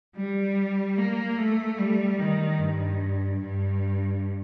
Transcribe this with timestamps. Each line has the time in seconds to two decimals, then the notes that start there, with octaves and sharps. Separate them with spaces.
0.16 G3
0.97 A#3
1.37 A3
1.78 G3
2.19 D#3
2.59 G2
3.40 G2